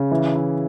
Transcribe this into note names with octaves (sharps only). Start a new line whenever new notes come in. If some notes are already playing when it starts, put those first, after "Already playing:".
Already playing: C#3
E3
E4